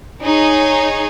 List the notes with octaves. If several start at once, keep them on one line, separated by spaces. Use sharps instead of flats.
D#4 G#4 C#5